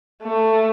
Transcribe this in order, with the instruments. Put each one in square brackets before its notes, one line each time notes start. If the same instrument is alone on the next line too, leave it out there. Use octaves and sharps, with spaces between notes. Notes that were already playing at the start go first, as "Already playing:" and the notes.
[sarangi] A3